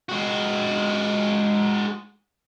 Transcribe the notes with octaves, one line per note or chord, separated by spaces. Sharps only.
G#3 F#4